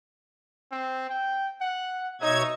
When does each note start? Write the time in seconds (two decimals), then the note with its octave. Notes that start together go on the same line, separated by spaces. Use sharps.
0.72 C4
1.10 G5
1.61 F#5
2.21 B2 D#4 C#5 E5 G#6